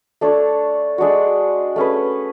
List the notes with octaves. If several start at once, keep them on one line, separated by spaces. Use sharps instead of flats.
A3 D4 A4 C#5
G#3 D4 F#4
A3 C#4 G#4 B4